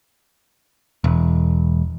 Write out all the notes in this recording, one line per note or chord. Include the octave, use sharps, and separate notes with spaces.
E1